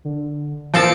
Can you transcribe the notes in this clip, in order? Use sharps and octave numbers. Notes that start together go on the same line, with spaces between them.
D3
A#2 E3 F3 C4 A5 C#7 D7